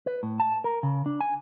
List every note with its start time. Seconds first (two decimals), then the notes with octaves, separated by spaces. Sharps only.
0.06 B4
0.23 A2
0.40 A5
0.64 A#4
0.83 C#3
1.06 D4
1.20 G#5